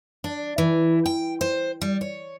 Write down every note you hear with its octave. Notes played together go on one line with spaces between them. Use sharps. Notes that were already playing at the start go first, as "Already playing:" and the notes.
D4
E3
G5
C5
G3
C#5